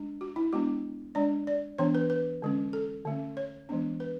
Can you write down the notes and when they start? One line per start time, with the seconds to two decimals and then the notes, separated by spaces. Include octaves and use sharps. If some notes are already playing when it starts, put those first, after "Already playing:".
Already playing: G#3 D4
0.21 F#4
0.36 E4
0.53 G#3 B3 D4 F#4
1.15 G#3 D4 D5
1.47 D5
1.78 E3 B3 D4 C#5
1.95 B4
2.10 B4
2.42 D3 G#3 C#4
2.73 A4
3.05 D3 A3 C#4
3.37 C#5
3.69 E3 G#3 B3 D4
4.00 B4